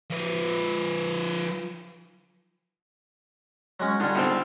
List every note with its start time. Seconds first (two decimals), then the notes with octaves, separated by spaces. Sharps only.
0.10 F3 B4
3.80 F#3 G#3 C#4
4.00 D3 G3 F4 G#4
4.15 B1 D3 C4